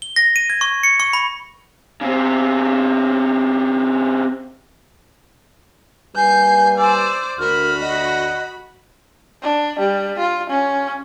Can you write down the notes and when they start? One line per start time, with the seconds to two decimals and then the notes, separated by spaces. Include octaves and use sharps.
0.02 G7
0.16 A#6
0.36 D#7
0.50 G#6
0.61 C#6
0.83 C#7
1.00 C#6
1.13 B5
2.01 C#3 C4
6.16 G3 A#3 B4 G#5 G6 C7
6.78 C5 D5 E6
7.40 D2 F#4 A#4 B5 F6
7.81 D#5 F#5
9.42 D4
9.79 G3
10.19 F4
10.49 C#4